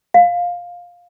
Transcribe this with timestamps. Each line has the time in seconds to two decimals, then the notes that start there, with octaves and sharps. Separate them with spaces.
0.14 F5